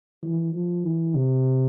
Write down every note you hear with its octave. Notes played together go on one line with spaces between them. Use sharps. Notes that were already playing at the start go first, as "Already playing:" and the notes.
E3
F3
E3
C3